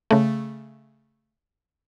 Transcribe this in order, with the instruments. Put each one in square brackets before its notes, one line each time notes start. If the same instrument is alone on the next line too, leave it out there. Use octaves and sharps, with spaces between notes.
[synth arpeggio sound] C#3 A3